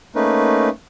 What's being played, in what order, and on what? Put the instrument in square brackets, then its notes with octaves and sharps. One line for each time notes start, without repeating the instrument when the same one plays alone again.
[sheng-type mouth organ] A3 A#3 C#4 D#4 B4